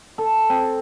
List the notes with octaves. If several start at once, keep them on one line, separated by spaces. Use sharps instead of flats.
A4
C4